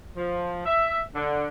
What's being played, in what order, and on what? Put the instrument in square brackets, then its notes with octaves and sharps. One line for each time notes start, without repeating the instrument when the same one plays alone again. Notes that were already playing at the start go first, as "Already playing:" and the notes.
[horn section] F3
E5
D3